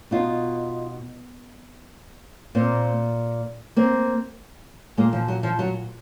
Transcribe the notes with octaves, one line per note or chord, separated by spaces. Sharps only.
B2 D#4 F4
A#2 A#3 C4
A#3 C4
A#2 G#3 A#3
F3
F#3
F3
F#3